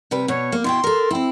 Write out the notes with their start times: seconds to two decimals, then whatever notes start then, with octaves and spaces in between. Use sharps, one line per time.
0.11 C3 G3 B4
0.28 B2 C#5
0.52 A#3
0.64 B2 E4 G5 C6
0.84 A4 A#4
1.11 C4 E4